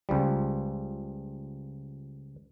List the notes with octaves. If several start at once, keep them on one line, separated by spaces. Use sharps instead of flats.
C#2 F3 G3